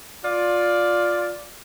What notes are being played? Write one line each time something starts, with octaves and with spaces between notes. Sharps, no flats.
F4 D5